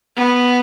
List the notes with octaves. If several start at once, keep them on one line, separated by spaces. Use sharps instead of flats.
B3